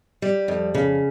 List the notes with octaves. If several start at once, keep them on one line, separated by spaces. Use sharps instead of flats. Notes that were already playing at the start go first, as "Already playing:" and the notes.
G3
F2
C#3